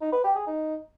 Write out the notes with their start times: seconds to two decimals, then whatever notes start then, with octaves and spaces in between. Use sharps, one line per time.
0.01 D#4
0.12 B4
0.24 G4
0.35 G#4
0.46 D#4